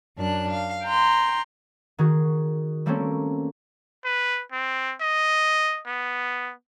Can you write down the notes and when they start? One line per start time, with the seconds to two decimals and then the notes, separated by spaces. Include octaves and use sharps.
0.18 F#2 D4 F#6
0.50 F5
0.85 G5 A#5 C6
1.98 D#3 F#4 G#4
2.86 G3 A3 A#3 C4 C#4
4.05 B4
4.52 C4
5.01 D#5
5.86 B3